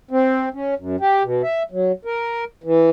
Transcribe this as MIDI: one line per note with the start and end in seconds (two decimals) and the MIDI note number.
0.11 0.49 60
0.54 0.74 61
0.78 0.96 42
1.00 1.23 67
1.23 1.42 47
1.43 1.63 76
1.72 1.92 54
2.05 2.44 70
2.64 2.90 52